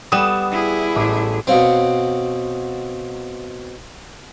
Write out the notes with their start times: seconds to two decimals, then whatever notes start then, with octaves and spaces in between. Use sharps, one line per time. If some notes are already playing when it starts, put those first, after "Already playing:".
0.12 G3 B3 D#6 E7
0.51 E4 G#4
0.95 A1 D6
1.47 B2 C4 C#5 F5 F#5